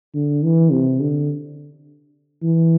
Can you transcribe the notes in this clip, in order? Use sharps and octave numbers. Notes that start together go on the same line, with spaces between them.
D3
E3
C3
D3
E3